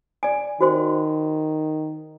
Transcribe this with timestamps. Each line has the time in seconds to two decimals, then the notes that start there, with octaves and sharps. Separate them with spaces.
0.23 D5 G#5
0.61 D#3 F#4 C5 C6